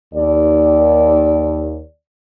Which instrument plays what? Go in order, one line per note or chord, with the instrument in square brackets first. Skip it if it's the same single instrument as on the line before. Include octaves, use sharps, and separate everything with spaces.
[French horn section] D#2 D5